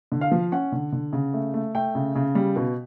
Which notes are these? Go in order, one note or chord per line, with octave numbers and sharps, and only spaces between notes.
D3
F5
F3
C#4 F#5
D3
D3
C#3
A3
A3
A3 G5
C#3
C#3
G3
B2